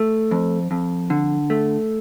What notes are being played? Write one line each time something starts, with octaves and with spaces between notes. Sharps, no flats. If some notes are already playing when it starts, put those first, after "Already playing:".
Already playing: A3
F2
F2
D3
A3